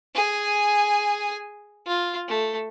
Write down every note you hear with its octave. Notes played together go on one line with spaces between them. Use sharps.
G#4 G#5
F4
A3